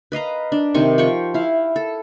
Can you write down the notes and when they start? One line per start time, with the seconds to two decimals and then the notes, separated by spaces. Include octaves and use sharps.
0.12 B4 D#5 F5 A#5
0.52 D4
0.74 C3 D#3 C4 C#6
0.98 F3 G5 C#6
1.34 E4 F5
1.76 A4